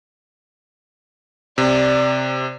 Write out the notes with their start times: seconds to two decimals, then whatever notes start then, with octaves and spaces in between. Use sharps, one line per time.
1.58 C3 D5